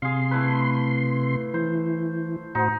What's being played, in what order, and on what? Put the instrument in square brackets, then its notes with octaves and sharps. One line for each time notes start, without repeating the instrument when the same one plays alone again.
[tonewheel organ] C3 C6 [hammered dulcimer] G#4 F5
[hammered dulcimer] A3 E4 B4
[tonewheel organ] E3 [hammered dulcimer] C5
[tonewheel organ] A2 F#4 C5 [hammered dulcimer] D#4